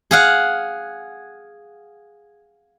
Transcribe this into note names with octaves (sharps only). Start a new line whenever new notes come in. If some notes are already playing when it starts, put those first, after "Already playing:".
G#4 F5 F#5